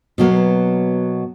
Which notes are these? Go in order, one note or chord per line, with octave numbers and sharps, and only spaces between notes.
B2 F#3 A#3 B3